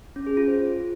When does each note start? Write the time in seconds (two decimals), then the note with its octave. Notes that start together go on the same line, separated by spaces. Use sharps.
0.16 C#4
0.27 G#4
0.37 F4
0.48 C5